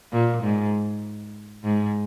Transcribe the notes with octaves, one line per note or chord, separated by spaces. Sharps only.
A#2
G#2
G#2